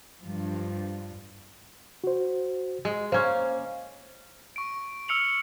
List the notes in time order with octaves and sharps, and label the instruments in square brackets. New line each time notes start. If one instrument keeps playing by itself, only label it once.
[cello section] G2 F3
[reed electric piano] F#4 C5
[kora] G#3
[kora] A#3 C#4 [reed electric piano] C5
[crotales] C#6 D7
E6 F6 C#7 F7 F#7